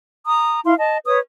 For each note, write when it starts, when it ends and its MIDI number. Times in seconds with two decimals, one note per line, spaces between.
0.25 0.60 82
0.25 0.60 87
0.64 0.74 64
0.64 0.74 77
0.64 0.74 84
0.78 0.97 75
0.78 0.97 81
1.05 1.19 71
1.05 1.19 73
1.05 1.19 87